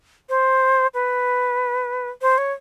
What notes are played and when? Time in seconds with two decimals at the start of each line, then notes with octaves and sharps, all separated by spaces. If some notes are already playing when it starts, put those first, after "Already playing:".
0.29 C5
0.94 B4
2.22 C5
2.38 C#5